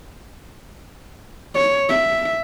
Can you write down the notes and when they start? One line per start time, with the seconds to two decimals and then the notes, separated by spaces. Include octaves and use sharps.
1.55 C#5
1.89 E5